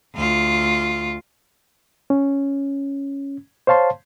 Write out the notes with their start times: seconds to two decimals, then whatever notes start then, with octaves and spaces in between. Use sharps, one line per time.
0.15 D2 F4
2.10 C#4
3.67 C5 C#5 F5 A5 C6